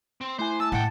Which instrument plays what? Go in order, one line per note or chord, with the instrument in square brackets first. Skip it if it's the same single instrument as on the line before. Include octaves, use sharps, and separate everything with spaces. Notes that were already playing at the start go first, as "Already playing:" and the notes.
[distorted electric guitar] C4
[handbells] A3 E4 G#5 [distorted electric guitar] C5
[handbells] A3 [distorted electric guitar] A5 [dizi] E6
[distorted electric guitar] C#2 G5 [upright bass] A2 [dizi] F#5 [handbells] A5 A6